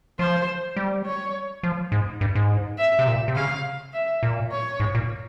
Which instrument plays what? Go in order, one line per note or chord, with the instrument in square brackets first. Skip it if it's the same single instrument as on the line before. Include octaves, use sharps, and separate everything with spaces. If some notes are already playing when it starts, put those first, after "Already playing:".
[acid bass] F3 [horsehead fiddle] C5
[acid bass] G3
[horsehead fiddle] C#5
[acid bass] F3
G#2
G2
G#2
[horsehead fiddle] E5
[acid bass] C3
A#2
C3
[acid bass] C#3 [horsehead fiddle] F5
[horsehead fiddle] E5
[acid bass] A#2
[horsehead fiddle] C#5
[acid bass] G#2
A#2